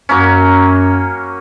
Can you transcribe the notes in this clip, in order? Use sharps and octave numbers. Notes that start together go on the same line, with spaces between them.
F#2 F#3 A#3 C#4